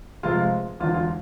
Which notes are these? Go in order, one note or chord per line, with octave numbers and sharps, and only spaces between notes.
F1 F2 C3 G#3 F4
E1 E2 D3 F4
F4